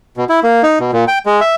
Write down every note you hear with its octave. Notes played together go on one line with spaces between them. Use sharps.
B2
E4
A#3
D#4
B2
A#2
G5
G#3
E5